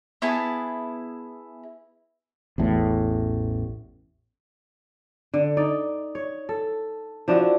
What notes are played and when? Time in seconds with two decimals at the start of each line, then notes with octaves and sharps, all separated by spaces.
0.22 B3 E4 G#4 A5
2.58 A1 E2 A2
5.34 D3
5.57 D#4 D5
6.15 C#5
6.49 A4
7.28 F3 D4 E4 F#4